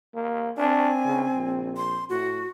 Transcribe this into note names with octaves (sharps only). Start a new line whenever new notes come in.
A#3
C4 D4 G#5
C#3
A#1
C6
A2 F#4